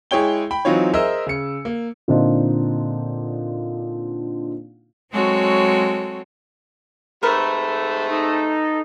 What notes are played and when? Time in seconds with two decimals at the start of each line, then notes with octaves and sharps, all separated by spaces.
0.11 G#3 E4 G#4 C#5 G5 G7
0.51 G5 B5
0.65 E3 F#3 C4 D#4 F4 C#5
0.93 G#4 A#4 C5 D#5 E5 E6
1.27 C#3 C#7
1.65 A#3
2.08 A#2 D3 C4 D4 D#4 F4
5.12 F#3 G#3 C4 F#4 A4 C#5
7.23 G#2 C3 A3 A#4 B4
8.09 D#4 A4